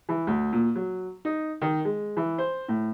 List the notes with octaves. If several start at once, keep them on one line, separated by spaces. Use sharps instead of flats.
E3
D2
A#2
F#3
D#4
D#3
G#3
E3
C5
A2